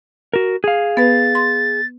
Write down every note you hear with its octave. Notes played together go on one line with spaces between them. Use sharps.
F#4 A#4
G#4 F5
B3 B4 A6
C6